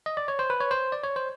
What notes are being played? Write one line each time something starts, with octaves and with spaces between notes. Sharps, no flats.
D#5
D5
C#5
C5
B4
C#5
C5
D5
C#5
C5